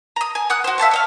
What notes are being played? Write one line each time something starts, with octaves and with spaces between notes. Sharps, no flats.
A#5 D#6
G#5
F#5 D#6 F#6
F#4 C5
E5 F5 A5 C#6
C#5 D#5 F5